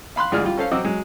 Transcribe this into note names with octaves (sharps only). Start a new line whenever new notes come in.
F5 B5 C6 F#6
D2 G#2 F4 G#4 D5 F6
G3 F4
C#4 A4 C5 F5
F#3 C4 D#5 F#5 D6 E6
F#3 G#3